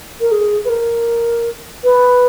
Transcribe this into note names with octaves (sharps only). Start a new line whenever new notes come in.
A#4
G#4
B4
A#4
B4